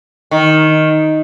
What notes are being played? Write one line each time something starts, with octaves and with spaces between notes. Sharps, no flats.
D#3